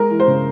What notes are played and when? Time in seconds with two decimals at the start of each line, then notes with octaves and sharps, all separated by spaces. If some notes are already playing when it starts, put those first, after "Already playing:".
Already playing: G#3 A#4
0.10 E3
0.20 C5
0.28 C#3